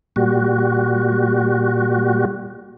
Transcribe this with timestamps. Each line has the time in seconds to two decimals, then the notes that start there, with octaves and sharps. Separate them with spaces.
0.16 A#2 G3 F#4